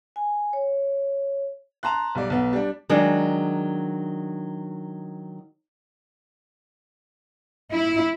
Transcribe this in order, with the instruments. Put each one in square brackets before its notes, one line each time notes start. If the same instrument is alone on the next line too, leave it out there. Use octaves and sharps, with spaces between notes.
[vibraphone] G#5
C#5
[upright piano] A5 A#5 C6 F#6
B1 G3 D5
B1 B3
G3 D4
[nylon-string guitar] D#3 F#3 G#3 D4
[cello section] E4